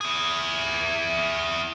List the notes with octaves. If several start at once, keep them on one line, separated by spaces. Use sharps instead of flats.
E4 G#4